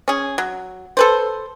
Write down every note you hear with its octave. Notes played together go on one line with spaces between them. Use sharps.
C#4 G#4
F#3
A4 B4 C5